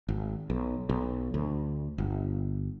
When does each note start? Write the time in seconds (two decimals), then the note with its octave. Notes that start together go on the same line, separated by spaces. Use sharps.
0.09 G#1
0.50 B1
0.89 B1
1.34 D2
1.98 G1